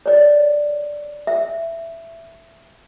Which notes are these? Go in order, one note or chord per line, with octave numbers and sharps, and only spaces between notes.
C#5 D5
E5